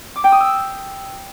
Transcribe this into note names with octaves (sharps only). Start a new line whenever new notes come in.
D6
G5
D#6
E6